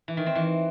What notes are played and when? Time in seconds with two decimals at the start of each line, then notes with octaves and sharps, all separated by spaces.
0.08 E3
0.17 D#3
0.26 C4
0.35 E3